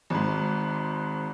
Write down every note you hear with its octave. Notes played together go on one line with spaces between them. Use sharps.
G#1 G#2